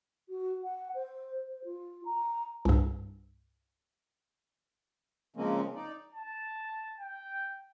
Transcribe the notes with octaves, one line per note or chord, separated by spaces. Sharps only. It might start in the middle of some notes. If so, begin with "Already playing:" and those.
F#4
F#5
C5
C5
F4
A#5
C2 G2
C#3 F3 G#3 A#3 C4 C#4
D#4 D5
A5
G5